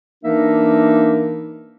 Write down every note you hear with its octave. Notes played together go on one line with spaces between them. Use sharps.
E3 A#3 D4 D#4 A#4 E5